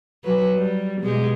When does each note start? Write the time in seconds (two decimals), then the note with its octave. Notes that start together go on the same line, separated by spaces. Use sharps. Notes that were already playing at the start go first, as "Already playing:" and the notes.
0.24 F#3 B4
0.55 G3
1.01 B2 G#3 G4